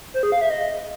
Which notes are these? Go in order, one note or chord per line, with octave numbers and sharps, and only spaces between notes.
C5
G#4
F5
E5
D#5